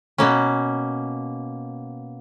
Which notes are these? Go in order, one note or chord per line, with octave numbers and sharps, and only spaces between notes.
B2 A#3 C#4